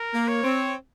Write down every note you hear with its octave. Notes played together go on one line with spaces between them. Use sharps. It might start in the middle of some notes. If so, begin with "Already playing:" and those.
Already playing: A#4
A#3
C#5
C4